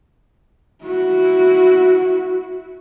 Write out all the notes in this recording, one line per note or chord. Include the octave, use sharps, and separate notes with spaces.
E4 F#4